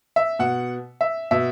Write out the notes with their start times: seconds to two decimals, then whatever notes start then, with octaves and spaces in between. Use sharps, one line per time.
0.16 E5
0.39 B2 F#5
1.01 E5
1.31 B2 E5